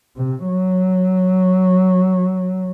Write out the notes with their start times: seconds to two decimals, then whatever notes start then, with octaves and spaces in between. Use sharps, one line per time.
0.17 C3
0.47 F#3